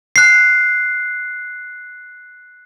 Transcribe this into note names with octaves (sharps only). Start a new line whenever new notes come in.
F#6 C7